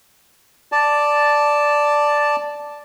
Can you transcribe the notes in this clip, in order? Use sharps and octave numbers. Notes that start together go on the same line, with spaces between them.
D5 A5